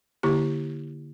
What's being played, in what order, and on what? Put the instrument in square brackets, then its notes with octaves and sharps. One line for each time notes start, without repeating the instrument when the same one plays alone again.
[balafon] D3 A#3 E4 G4